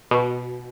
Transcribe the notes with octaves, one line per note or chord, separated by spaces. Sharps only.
B2